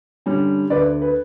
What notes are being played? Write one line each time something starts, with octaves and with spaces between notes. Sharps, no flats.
D3 G3 C#4
D2 B4 D5
B4